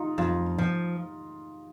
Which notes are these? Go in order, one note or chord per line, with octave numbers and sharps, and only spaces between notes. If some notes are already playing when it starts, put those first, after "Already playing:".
Already playing: D#4 F4
F2 F4
F3